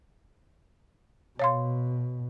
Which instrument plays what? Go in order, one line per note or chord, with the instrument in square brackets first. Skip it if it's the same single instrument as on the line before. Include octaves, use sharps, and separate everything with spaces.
[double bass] B2 [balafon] C#5 F5 C6